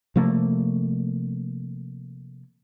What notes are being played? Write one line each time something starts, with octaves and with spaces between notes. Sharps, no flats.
C3 F3 A3 A#3